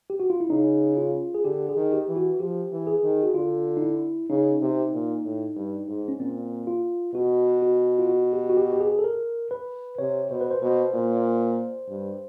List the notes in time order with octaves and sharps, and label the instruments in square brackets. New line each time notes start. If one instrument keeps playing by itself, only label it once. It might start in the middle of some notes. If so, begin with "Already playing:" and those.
[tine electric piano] G4
F#4
F4
E4
[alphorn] C#3 [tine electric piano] D#4
[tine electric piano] F4
G#4
[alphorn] D3 [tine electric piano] G4
[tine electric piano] G#4
[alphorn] D#3
[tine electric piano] G4
[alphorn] E3
[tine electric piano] F#4
[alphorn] F3 [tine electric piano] G4
[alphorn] E3
[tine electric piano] G#4
[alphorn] D#3
[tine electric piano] F#4
[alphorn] D3 [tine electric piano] F4
[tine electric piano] D#4
E4
[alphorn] C#3 [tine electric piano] D#4
[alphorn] C3
A#2
A2
G2
G#2
[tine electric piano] C#4
[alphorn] A#2 [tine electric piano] C4
[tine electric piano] F4
[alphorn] B2 [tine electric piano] F#4
[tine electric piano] F#4
F4
F#4
G4
F#4
G4
G4
G#4
A4
A#4
B4
[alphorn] C3 [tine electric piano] C#5
[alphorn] B2 [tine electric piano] C5
[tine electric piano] B4
C5
[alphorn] B2 [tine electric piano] C5
[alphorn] A#2
G2